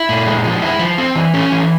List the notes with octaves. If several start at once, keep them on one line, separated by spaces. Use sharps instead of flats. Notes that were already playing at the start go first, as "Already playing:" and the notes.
Already playing: E4
A#2
G#3
F3
E4
F3
C4
E3
C#4
E3